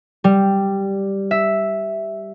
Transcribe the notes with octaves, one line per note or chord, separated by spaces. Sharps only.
G3
E5